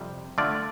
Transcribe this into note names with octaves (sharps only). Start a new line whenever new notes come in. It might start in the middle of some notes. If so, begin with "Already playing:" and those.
Already playing: F2 C3 G3
D3 A3 F4 D5